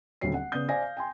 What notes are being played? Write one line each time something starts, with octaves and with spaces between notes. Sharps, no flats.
D#1 D2 F#3 C4 C#4 C7
F#5
C#3 B3 D5 D#6 G6
C5 D5 F5 G#5 A#6
F5
G5 G#5 C6